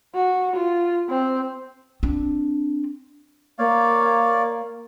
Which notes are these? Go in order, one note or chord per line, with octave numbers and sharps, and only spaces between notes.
F#4
F4
C4
C4 D4
A#3 C#5 D5 F5